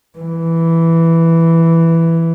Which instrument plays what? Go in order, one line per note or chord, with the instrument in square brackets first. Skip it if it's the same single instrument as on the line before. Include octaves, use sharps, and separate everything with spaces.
[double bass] E3